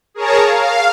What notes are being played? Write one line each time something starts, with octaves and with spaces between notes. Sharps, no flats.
G#4 A#4 C#5 A5 A#5
F5